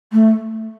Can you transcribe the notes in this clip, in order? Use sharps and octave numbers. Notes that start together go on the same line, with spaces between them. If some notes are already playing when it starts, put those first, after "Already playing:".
A3